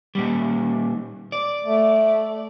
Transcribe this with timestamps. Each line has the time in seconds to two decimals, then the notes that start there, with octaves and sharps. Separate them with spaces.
0.15 A#2 G3
1.32 D5
1.63 A3